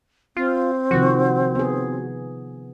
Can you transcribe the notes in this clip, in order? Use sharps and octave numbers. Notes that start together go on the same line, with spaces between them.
C4 F4
C3 D#3 F3 F#4
B3 G#4